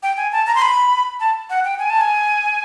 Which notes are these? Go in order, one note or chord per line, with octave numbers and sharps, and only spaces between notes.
G5
G#5
A5
A#5
C6
B5
A5
F#5
G5
G#5
A5
G#5